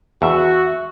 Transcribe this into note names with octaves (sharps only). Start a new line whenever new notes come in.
E2 F#4 E5